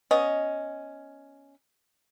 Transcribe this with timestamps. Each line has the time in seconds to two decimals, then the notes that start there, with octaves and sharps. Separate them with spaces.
0.11 B3 C#4 D#5